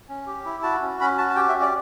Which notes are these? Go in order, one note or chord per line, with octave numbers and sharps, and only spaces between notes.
C#4
G4
E4
F#4 A5
C#4
C#4 B5
F#4 A5
A5
G4 G5
E5
C#4
D5